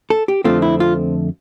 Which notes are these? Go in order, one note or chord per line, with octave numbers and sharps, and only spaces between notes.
A4
G4
F2 D3 A3 C4 F4
E4
F4